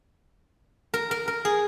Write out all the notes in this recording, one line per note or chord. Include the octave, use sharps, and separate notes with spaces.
A#4
A#4
A#4
G#4